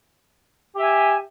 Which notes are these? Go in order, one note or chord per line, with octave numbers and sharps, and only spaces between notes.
G4 E5 G#5